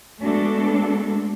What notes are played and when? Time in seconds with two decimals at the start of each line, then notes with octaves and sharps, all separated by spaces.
0.21 G#3 A3 B3 D4 F#4 A4